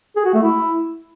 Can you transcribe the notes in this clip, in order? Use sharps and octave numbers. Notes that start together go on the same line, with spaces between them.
G#4
F#4
A3
E4